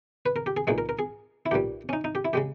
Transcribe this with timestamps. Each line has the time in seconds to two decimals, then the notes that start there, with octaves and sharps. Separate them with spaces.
0.26 B4
0.36 A#4
0.46 G4
0.57 G#4
0.67 B1 A#2 G#3 G#4
0.78 A#4
0.89 A#4
0.99 G#4
1.46 E4
1.51 B1 A#2 G3 G4
1.89 C#4
1.93 D#4
2.04 D#4
2.15 G4
2.25 E4
2.33 C#3 G#3 G4